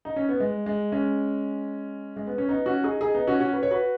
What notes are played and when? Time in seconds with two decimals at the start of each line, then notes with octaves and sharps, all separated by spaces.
0.05 D#4
0.16 C#4
0.29 B3
0.40 G#3
0.66 G#3
0.92 G#3 C#4
2.16 G#3
2.27 B3
2.38 C#4
2.49 B3 D#4
2.66 C#4 F#4
2.84 D#4 G#4
3.01 D#4 G#4
3.14 B3 D#4
3.27 C#4 F#4
3.40 C#4 F#4
3.53 B4
3.63 C#5
3.71 F#4 B4